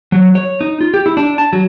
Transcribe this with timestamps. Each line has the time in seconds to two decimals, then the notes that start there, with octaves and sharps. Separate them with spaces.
0.12 F#3
0.35 C#5
0.61 D#4
0.81 F4
0.94 G4
1.06 E4
1.17 D4
1.38 A5
1.53 F#3